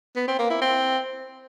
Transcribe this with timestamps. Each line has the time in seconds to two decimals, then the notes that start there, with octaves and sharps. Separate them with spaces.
0.16 B3
0.28 C4
0.39 A#3
0.50 E4
0.62 C4